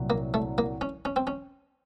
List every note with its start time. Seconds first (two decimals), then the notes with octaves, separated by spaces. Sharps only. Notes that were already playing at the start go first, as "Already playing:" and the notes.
Already playing: C2 A#2 F#3
0.10 A#3
0.34 A3
0.58 A#3
0.81 C#4
1.05 C#4
1.16 C4
1.27 C#4